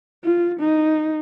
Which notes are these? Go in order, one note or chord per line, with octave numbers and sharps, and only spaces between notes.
F4
D#4